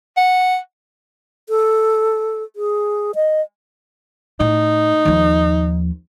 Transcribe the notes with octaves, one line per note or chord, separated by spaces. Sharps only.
F#5
A4
G#4
D#5
A2 D#4
D#2 F3